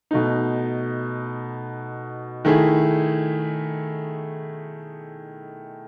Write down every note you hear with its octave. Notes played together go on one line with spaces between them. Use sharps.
B2 A3 D#4
D#3 A3 E4 G#4